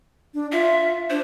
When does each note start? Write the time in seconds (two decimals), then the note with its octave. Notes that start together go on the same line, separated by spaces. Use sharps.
0.34 D4
0.52 F4 E5
1.10 D4 C5